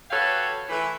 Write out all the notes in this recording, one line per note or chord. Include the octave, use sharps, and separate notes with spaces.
F#4 G4 A4 B4 C#5 F5
E3 A3 B4